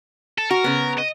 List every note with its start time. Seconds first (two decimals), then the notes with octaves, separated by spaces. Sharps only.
0.38 A4
0.51 F#4 A#4
0.64 C#3 B3
0.98 D#5